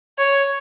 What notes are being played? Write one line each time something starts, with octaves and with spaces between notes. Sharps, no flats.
C#5